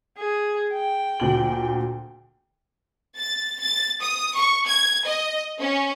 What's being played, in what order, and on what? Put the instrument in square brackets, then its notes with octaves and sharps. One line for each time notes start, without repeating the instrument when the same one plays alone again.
[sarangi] G#4
G5
[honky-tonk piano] D2 A#2 F#7
[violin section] A6
A6
D#6
C#6
G#6
D#5
C#4